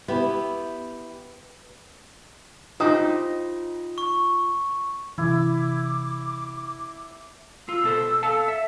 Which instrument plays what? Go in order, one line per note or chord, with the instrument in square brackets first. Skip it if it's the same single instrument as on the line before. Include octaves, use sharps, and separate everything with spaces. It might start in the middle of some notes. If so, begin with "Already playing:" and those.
[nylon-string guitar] B3 [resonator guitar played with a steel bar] E4 G4
[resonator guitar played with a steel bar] D#4 G4 C5 [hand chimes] F4 [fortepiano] D#5 D#6
[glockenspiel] C#6
[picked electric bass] C3 E3 [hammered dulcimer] E4 [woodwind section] D6
[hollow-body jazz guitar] F4 [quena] E6
[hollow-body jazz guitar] B2 A4 C5
A4 F5 A5
E5